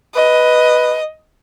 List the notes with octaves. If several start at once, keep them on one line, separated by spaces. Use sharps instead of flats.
B4 D#5